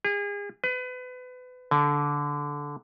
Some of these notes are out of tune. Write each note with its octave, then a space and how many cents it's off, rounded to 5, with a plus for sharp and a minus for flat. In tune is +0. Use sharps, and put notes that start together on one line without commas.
G#4 -35
B4 +30
D3 -15